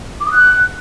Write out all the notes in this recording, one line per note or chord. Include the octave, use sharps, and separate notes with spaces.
D6
D#6
F#6